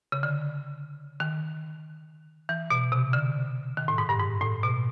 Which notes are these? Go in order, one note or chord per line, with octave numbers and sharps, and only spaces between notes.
C#3
D3
D#3
E3
B2
C3
D3
D#3
A2
G#2
G2
G#2
A2
B2